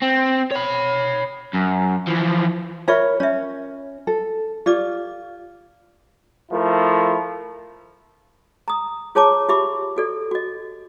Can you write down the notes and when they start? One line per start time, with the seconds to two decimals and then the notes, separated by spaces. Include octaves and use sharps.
0.02 C4
0.51 C#5 B5
1.54 F#2
2.08 E3 F3
2.88 F4 A#4 C#5 E5 B5 C#6
3.20 C#4 C#5 E5
4.07 A4
4.66 F4 G4 D5 D6
6.52 F3 A3 E4 A#4
8.68 A#5 D#6
9.15 F4 G#4 C#5 A5 A#5 D6
9.49 F4 G4 E5 B5 D6
9.97 F#4 A4 D5
10.31 F#4 D#5